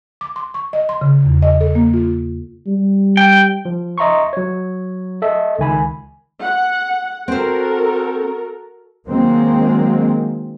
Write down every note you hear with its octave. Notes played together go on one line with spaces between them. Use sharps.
D6
C6
C#6
D#5
C6
C#3
E2
D#5
A4
A#3
F4
G3
G5
F3
D#5 E5 A#5 C6 C#6
F#3 C#5
A4 D#5 E5
C#2 D#3 G#5 B5
F#5
C4 F#4 A4 A#4 C5
D#3 F#3 G#3 A#3 C4